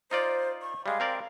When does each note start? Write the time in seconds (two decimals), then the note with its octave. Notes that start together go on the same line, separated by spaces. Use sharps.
0.11 D#4 F4 C5 D5
0.62 C#6
0.86 G3 G#3 F5
1.00 C4 A#4 D5